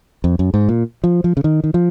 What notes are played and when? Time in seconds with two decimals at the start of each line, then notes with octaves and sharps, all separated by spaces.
0.24 F2
0.39 F#2
0.54 G#2
0.69 A#2
1.04 F3
1.24 F3
1.37 C#3
1.44 D#3
1.64 D#3
1.74 F3